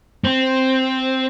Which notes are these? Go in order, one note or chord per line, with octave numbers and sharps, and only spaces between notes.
C4